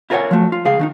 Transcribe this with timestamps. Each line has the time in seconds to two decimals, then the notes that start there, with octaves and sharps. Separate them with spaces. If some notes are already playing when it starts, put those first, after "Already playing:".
0.10 E4 F4 A#4 B4 C#5 F#5
0.31 F3 F#3 A3
0.52 F4
0.65 C#2 G#4 F5
0.79 D#3 D4 D#4